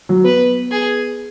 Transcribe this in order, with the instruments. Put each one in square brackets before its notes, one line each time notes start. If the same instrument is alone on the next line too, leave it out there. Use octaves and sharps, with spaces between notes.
[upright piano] F#3
[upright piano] B3 [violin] B4
[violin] G#4